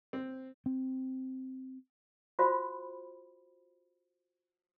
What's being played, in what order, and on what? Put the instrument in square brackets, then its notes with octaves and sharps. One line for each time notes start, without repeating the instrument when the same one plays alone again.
[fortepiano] C4
[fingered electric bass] C4
[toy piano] F4 F#4 C5 F5 B5